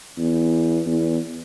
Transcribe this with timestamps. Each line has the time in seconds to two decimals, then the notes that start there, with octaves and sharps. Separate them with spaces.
0.18 E2
0.86 E2